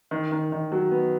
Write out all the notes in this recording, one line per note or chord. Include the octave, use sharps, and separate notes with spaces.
D#3
D#3
D#3
F#3
B3